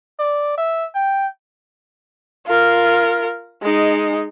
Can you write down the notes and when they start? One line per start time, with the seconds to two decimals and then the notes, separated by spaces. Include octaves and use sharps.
0.19 D5
0.58 E5
0.95 G5
2.46 F4 A#4
3.62 G#3 D#4